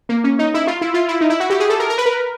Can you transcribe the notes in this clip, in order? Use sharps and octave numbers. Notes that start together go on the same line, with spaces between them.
A#3
C#4
D#4
E4
F4
E4
F4
E4
D#4
E4
F#4
G4
G#4
A4
A#4
A#4
B4
A#4